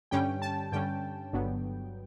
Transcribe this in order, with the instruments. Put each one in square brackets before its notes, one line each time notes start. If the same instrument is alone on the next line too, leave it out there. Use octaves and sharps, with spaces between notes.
[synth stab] G2 D3 G3 C#4 G5
A5
G2 D3 G3 C#4 G5
G1 G2 D3 F#3 B3